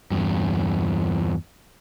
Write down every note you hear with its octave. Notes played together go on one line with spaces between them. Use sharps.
E2 G2